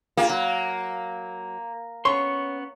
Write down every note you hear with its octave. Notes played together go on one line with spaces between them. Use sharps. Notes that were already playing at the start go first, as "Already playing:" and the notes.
A#3 F4 G4 G#4
F#3
B3 C#4 C#5 C6 C#6